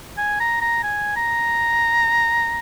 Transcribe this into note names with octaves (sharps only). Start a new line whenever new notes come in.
G#5
A#5
A#5
G#5
A#5